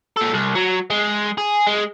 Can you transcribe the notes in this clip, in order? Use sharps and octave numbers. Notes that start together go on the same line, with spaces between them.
A#2 A4
C2
F#3
G#3
G#4
G#3